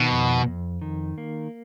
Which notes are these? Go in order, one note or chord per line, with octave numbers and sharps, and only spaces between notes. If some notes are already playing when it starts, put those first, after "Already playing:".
Already playing: B2 D#3
F2
F2
D#3
A#3